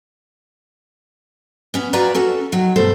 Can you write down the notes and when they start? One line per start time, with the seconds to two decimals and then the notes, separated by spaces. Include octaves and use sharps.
1.74 B3 C#4
1.93 F4 F#4 B4 D5 G#5 A#5
2.15 C#4 F#4 A4
2.52 D#3 F#3
2.76 G2 B2 A3 A4 C5